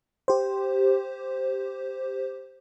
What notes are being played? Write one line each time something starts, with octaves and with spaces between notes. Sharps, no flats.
G4 C5